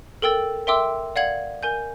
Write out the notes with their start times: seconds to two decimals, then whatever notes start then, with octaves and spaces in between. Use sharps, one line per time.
0.22 A4 A#4 G5 E6 A6
0.67 A#4 E5 G5 C6 D6 E6
1.16 D5 F5 F#5 G#6 F#7
1.63 A#4 G#5 G6